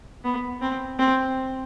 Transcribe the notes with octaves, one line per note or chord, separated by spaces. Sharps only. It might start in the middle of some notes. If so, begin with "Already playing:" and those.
B3
C4
C4